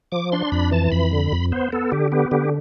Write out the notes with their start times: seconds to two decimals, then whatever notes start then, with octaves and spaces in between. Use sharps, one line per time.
0.12 F3 D6
0.32 D4 C6
0.52 F2 B5
0.71 E3 A5
0.92 F2 B5
1.13 D3
1.32 F2
1.52 B3 C5
1.72 B3 A4
1.92 D3 G4
2.12 B3 G4
2.31 D3 G4